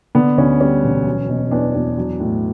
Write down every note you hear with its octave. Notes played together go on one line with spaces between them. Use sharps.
D3 B3
D2 C#4
G3 C#4
E1
F#3
B2
E2 D4
E2
F#3
A2